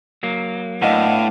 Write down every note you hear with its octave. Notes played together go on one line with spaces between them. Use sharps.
F#3 A#3
A2 B3 D4 D#5 F5 F#5